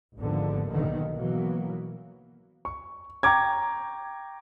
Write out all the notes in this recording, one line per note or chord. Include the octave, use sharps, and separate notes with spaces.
G#1 D#2 G#2 D3 F3 B3
B1 D3 D#3 A#3 B3
B2 E3 F#3 A#3 B3
C#6
G5 A#5 C#6 D6 G#6